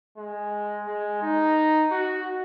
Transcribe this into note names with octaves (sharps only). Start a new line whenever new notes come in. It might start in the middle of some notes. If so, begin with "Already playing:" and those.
G#3
G#3
D#4
F#4